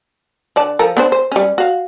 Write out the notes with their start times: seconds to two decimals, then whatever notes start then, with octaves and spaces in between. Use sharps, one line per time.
0.56 D3 D5 A5
0.79 F3 A4 A#4
0.97 B3 D4 C5
1.12 C5
1.32 G3 C#4
1.58 F#4 F5